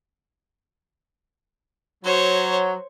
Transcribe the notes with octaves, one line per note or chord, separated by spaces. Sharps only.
F#3 C5 C#5